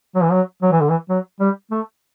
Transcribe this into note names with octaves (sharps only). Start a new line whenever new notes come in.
F#3
E3
F#3
F#3
E3
D3
E3
F#3
G3
A3